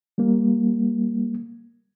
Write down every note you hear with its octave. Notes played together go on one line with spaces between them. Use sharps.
G3 A#3